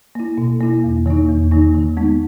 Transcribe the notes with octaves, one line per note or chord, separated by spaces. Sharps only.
A#3 E4
B2
A#3 E4
E2
D#3 A#3 D#4
E2
D#3 A#3 D#4
D#3
G#3 B3 D#4